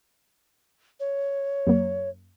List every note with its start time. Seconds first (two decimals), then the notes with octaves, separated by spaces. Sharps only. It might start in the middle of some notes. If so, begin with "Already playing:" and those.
1.00 C#5
1.67 F#2 F#3 A#3